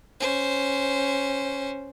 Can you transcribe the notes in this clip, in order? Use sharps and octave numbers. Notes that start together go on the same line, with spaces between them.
C#4 C5